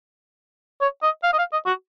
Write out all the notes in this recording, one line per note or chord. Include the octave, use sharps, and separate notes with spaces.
C#5
D#5
F5
D#5
F5
D#5
F#4